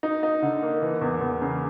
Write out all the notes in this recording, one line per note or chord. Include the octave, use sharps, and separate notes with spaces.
D#4
D#4
D3
A#3
E3
E2
E2
C#3